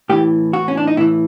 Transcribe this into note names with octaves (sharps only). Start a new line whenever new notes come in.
A2 E3 G4
F#4
C#4
D4
D#4
A2 E3 E4